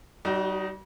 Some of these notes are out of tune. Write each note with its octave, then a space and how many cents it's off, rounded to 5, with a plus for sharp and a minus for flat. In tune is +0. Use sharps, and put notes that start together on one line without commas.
G3 -30 D#4 +5 F#4 +15